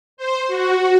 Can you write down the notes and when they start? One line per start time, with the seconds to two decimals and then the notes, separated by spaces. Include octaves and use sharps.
0.17 C5
0.47 F#4